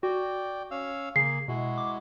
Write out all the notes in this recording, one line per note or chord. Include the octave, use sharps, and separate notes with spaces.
F#4 D5 G5
C#4 F5 E6
C#3 A#3 G#4 C7
B2 G#3 E4 F#4
D6